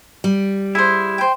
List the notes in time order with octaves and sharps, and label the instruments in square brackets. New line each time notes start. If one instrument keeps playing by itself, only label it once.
[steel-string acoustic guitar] G3
[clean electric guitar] E4 [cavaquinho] G#4 C5
[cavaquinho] C5 G5